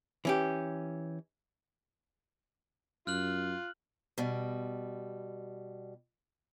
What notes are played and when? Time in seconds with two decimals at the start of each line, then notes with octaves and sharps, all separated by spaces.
0.25 E3 C#4 G4
3.07 F#2 F4 F6 F#6 F#7
4.18 B2 G3